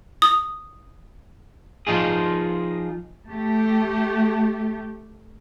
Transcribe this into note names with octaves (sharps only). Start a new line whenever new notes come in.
D#6
F3 D#4 F4 G#4
A3 G4